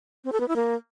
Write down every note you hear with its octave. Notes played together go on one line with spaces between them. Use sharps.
C4
A4
B3
E4
A#3